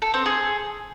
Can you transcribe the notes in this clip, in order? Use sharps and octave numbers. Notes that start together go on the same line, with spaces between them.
A4
C4
G#4